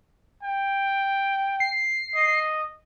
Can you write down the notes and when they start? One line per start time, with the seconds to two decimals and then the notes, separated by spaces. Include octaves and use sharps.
0.43 G5
1.60 C7
2.16 D#5